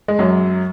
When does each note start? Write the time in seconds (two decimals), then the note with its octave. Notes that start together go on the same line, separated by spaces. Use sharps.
0.08 G#3
0.19 F#2 F#3